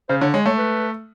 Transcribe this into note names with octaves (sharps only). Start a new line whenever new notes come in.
C#3 C5
D3 C#5
G#3 C#5
A3 C#5
B4